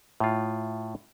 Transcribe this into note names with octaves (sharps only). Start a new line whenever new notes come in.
A2 F4